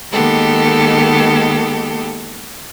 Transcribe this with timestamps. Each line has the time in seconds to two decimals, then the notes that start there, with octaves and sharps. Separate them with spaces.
0.12 D#3 G#3 A#3 B3 G4 A4